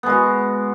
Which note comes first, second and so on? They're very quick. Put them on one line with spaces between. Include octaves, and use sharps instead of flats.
B3 G#3 F#4